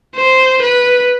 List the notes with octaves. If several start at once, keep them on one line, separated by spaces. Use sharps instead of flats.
C5
B4